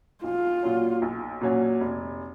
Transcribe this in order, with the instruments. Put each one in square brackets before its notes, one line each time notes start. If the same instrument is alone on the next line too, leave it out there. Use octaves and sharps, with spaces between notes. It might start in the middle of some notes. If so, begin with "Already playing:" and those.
[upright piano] B1 [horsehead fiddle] F4
[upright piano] A#2 F#3 C#4
B1
A#2 F#3 C#4
F1